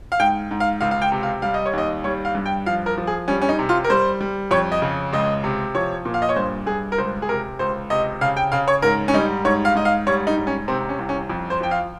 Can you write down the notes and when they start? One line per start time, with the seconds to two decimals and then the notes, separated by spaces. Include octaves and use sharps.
0.12 F5
0.19 G#2 G5
0.51 G#2
0.60 F5
0.81 C#2 F5
0.91 F5
1.02 G5
1.12 C3
1.23 F5
1.42 G3 F5
1.54 D#5
1.66 C#5
1.73 D#2 D#5
2.04 G3 C#5
2.25 F5
2.35 G2
2.46 G5
2.66 F3 F5
2.86 A#4
2.98 F3
3.07 G#4
3.28 G3 C#4
3.41 C#4
3.49 D#4
3.59 C3
3.69 F4
3.84 A#4
3.90 G3 C5
4.21 G3
4.51 F2 C#5
4.72 D#5
4.82 C#3
5.13 C#2 D#5
5.44 C3
5.75 F3 C#5
6.05 A#2
6.14 F5
6.22 D#5
6.29 C#5
6.36 G2 C5
6.66 G2 G#4
6.92 A#4
6.98 C#2 C5
7.22 G#4
7.29 C3 A#4
7.59 C#2 C5
7.90 C3 D#5
8.21 C#3 F5
8.37 G5
8.52 C#3 F5
8.68 C#5
8.82 G#2 A#4
9.08 C#4
9.14 G3 D#4
9.45 G#2 C#5
9.65 F5
9.75 G#2 D#5
9.85 F5
10.07 G3 C#5
10.27 D#4
10.37 G#2
10.47 C#4
10.68 C3 C4
10.89 C#4
10.99 C2
11.09 C#4
11.30 F2
11.50 C5
11.61 F3 G5
11.71 F5